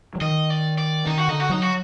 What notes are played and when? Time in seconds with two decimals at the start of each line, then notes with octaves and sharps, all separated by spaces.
0.15 F#3
0.21 D#3 D#5
0.50 D5
0.78 D5
1.07 D#3 D#4
1.18 F#4
1.28 D3 D#4
1.40 F#4
1.49 F#3 D#4
1.62 F#4